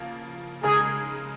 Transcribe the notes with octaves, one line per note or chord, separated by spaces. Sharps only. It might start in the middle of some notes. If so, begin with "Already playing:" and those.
Already playing: C#3 F3 A#3
C#3 G#3 D#4 G#4 A#4